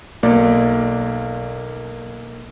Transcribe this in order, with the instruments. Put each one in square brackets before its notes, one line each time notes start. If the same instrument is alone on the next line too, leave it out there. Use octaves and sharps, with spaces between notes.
[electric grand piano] B1 A#3 D5